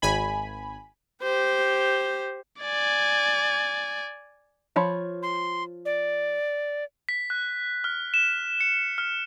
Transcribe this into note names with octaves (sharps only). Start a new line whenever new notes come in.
G#1 G#5 B5
G4 C5
D5 G#5
F3 C#5 B5
C6
D5
B6
F#6
F6
E7
C#7
F6